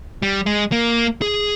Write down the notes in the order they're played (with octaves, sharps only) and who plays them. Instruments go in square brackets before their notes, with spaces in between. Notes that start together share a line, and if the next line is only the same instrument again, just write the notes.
[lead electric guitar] G3
G#3
A#3
G#4